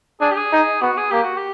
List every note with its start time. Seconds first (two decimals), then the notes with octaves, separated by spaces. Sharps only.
0.21 D4 G#4
0.31 G4
0.37 G#4
0.52 D#4
0.81 B3 F#4
0.97 G#4
1.11 A#3 G4
1.23 F#4
1.37 G4